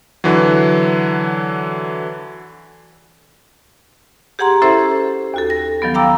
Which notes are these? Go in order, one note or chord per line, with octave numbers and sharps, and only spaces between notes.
D3 E3 F#3
G4 G#4 F#5 A#5 C6
C#4 E4 A4 C5 E5 C6
D#2 F#4 A4
A#6
D#3 F3 F#3 B3
F5 G5 A#5 D6 E6